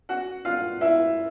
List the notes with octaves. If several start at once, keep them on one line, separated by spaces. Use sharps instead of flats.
F#4 F#5
F4 F5
E4 E5